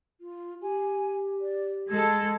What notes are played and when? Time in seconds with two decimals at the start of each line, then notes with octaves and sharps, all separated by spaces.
0.21 F4
0.62 G4 G#5
1.41 D5
1.89 G#3 A4 G#6